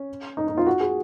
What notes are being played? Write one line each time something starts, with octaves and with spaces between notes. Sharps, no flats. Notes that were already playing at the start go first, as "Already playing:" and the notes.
Already playing: C#4
D#4
D#4
F4
F#4
G#4